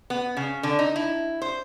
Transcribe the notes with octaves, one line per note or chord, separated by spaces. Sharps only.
B3
C#3
D3
D#4
E4
C5